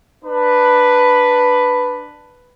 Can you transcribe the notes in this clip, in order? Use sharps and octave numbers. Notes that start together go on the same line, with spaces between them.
D4 B4